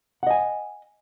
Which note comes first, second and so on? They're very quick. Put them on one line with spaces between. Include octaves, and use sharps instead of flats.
F#5 D#5 G#5